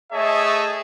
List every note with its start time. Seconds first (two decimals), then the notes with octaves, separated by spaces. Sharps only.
0.12 A3 G#4 C#5 D#5 E5 A5